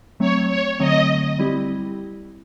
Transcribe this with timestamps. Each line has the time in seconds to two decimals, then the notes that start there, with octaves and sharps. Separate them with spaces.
0.20 F#3 A3 C4 C#5
0.49 C#5
0.79 D3 F#3 A3 C4 D#5
1.39 G3 C4 E4 G4